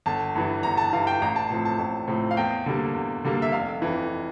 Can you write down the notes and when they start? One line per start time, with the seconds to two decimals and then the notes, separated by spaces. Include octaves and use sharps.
0.06 G1 A5
0.35 G2 E3
0.63 G1 A#5
0.77 A5
0.93 G2 E3 F5
1.07 G5
1.21 A1 A#5
1.36 A5
1.50 A2 F3 C4
1.65 A5
1.79 A1
2.08 A2 F3 C4
2.31 F5
2.37 E2 G5
2.66 D3 G3 A#3
2.95 E2
3.24 D3 G3 A#3
3.42 E5
3.52 F1 F5
3.82 F2 E3